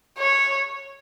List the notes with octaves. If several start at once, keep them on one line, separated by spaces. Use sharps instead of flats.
C#5